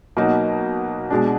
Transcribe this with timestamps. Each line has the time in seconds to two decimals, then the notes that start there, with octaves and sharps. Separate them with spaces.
0.17 B2 F#3 A#3 D#4 F#4
1.10 B2 G#3 D4